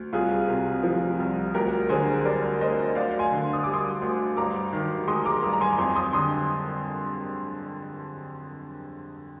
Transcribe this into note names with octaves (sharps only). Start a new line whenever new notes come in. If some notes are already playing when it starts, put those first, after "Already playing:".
Already playing: D2
C2 F4 G#4
C3
F3
C2
D2 G4 A#4
D3 G#4 C5
G3 A#4 D5
D2 C5 D#5
D2 D5 F5
G#5 C6
D3
D#6
G3 D6
C6 D#6
D2
G2 A#5 D6
D#3
G#3 C6 D#6
A#5 D6
G2
A#5
G#5 C6
F2 G#5 C6
C6 D#6
D3 C6 D#6